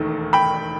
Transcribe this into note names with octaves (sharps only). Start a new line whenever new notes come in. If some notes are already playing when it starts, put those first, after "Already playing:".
Already playing: E1 D#2 D#3 A3
G5 B5